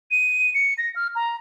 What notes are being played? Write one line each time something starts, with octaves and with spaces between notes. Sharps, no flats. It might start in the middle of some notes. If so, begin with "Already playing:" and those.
D#7
C#7
A#6
F6
A#5